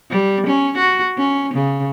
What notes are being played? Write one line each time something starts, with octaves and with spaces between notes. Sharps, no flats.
G3
C#4
F#4
C#4
C#3